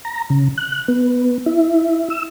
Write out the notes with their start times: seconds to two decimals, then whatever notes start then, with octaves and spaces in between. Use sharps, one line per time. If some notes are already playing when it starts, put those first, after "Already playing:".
0.05 A#5
0.30 C#3
0.57 F#6
0.88 B3
1.46 E4
2.10 E6